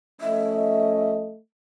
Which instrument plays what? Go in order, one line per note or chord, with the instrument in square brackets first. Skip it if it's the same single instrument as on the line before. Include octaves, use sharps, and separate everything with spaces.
[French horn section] F3 C#4 D#5 [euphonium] A3 [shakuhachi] E5